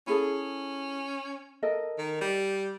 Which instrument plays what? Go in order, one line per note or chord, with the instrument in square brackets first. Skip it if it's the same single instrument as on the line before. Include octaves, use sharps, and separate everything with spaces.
[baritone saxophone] C#4 [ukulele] E4 G#4 A4
[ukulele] A4 A#4 D#5
[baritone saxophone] D#3
G3